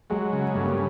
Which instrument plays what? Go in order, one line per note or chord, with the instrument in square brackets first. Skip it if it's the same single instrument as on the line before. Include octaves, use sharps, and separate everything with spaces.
[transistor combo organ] F#3 [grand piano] G#3
[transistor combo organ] C#3
[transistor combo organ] G2 [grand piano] A3
[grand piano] A#3
A3